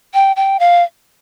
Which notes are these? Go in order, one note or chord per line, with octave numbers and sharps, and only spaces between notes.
G5
G5
F5